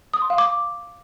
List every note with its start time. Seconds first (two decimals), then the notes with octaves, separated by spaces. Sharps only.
0.14 D#6
0.22 C6
0.30 F5
0.38 D6